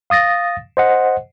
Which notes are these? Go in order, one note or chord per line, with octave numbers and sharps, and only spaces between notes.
F5 D#6 A6 A#6
C5 D#5 F#5